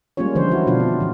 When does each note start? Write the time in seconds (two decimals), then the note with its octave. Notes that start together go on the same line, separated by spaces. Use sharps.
0.17 G3 G#3 A#3 C#4 F4 C#5
0.35 D3 E3 F3 D4 C5
0.51 E4 F#4
0.67 B2 D4 F4
0.80 C4
1.00 A#2 E3